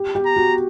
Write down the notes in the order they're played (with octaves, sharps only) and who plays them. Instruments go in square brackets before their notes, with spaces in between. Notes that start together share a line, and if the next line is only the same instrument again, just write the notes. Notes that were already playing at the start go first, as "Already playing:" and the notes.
Already playing: [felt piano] G4
G4
[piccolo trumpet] A#5
[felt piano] F#4